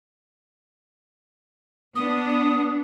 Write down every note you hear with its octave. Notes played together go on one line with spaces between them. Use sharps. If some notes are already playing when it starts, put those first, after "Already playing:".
B3 D4 D#6